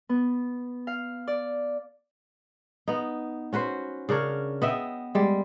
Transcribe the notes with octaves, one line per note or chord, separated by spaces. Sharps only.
B3
F5
D5
B3 D#4
C#4 F#4 B4 C5
C#3 D4 A#4 C#5
B3 D#5 E5 G5
G3 G#3